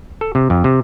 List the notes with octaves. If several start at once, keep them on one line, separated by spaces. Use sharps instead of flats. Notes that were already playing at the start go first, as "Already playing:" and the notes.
A4
C3
F2
C3